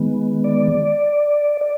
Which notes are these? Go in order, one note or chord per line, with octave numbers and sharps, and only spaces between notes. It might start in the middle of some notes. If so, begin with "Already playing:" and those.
Already playing: D#3 G#3 B3
D5
D5